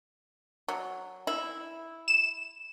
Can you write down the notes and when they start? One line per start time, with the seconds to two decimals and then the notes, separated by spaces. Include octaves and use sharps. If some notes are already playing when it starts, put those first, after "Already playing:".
0.68 F#3
1.27 E4
2.08 E7